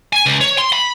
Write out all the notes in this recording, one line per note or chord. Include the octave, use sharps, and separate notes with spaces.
G#5
C#2
C#5
C6
B5